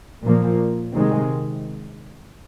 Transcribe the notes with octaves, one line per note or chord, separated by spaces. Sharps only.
A#2 F3 A#3
C3 D#3 G#3 C4